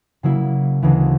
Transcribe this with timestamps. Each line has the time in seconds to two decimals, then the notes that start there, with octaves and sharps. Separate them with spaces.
0.23 C#3 F#3 A#3 E4
0.82 D2 C#3 E3